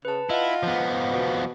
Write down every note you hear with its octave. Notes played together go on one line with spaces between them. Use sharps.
C#3 B4 A5
E4 F4 D#5 F#5
F3 B3
B2